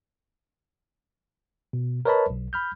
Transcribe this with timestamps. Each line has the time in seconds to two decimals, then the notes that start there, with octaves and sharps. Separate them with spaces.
1.73 B2
2.05 A#4 B4 C#5 D#5 A5 B5
2.30 B1
2.53 B5 F6 G6